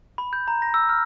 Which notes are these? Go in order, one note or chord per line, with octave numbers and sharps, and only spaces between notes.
B5
G6
A#5
A#6
E6
F6